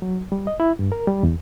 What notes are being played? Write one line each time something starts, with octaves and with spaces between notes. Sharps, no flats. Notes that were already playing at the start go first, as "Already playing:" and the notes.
F#3
G3
D#5
E4
G2
A#4
G3
E2